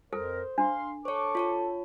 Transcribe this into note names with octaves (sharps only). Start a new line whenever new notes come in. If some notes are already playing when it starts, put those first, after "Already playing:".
F2 A4 A#4 C5
D4 F5 C6
A4 C5 C#5 C#6 D6
F4 C#5 A5